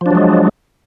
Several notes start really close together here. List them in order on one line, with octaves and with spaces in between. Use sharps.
F3 D4 F#3 G#3